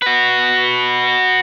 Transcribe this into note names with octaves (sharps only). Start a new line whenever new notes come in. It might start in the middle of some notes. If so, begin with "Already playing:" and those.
F#4 B4